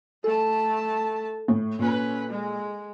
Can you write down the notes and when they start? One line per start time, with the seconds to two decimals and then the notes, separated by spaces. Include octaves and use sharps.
0.24 A3 A4 A5
1.48 A2
1.79 A#2 C#4 B4
2.29 G#3